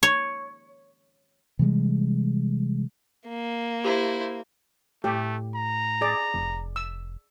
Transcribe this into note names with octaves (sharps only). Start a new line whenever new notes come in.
C#5
C3 E3 G3 G#3
A#3
E4 G4 C5
A2 A3 G4
A#5
G#4 D5
F1
E6